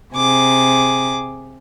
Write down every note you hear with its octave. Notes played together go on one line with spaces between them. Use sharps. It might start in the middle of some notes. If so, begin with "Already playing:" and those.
C3 G#4 D6